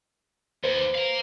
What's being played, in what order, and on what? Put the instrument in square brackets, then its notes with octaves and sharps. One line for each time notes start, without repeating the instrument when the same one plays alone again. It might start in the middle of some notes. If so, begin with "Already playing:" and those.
[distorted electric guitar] D#2 [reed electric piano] B4 C5
[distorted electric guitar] F5 A#5